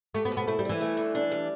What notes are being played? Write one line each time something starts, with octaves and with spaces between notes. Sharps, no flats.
A3 G4
B3
B2
B3
A3 E4
G3
E3 E4
A3
D3
D4
G3